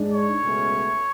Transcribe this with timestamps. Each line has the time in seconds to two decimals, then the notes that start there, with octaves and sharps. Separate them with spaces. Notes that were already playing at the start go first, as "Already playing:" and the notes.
Already playing: G#2 G#3 D4
0.12 C#5
0.41 C#2 B2 A3 C#4